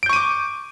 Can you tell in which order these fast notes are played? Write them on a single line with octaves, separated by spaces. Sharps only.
D7 G6 C#6 D#7 D6